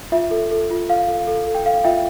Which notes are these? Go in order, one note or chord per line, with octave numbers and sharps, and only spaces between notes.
F4 E5
A4
A4
F4
A4 F5
A4
A4
A4
G5
A4 F5
F4 E5 G5